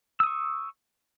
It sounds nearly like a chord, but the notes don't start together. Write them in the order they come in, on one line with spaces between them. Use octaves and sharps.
E6 D#6 C#6